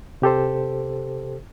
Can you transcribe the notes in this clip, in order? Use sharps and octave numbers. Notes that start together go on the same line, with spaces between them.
C3 G4 A4 C5